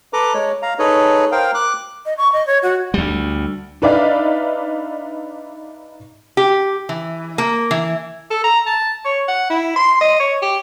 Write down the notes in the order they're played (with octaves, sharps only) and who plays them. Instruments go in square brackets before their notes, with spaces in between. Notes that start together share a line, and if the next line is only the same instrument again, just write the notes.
[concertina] A4 B4 A#5 D6
G#3 C#5
F5 A#5
D#4 G#4 A4 B4 C#5
A#4 C5 F5 G5
D6 F#6
[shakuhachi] D#5
C#6
D#5
C#5
F#4
[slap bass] D2 G3
[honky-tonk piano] D4 D#4 B4 D5 E5 F5
[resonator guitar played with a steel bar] G4
E3
A#3
E3
[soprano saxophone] A4
A#5
A5
C#5
F#5
E4
C6
D#5
C#5
G4